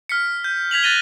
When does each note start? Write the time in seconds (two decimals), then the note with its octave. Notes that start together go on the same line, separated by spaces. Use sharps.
0.09 F6 B6 C#7
0.44 G6
0.71 G#6 B6 F7 F#7
0.83 F#6 A6 A#6 D#7 G7